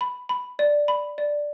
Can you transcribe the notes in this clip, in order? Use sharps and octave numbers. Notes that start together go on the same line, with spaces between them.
B5
B5
D5
B5
D5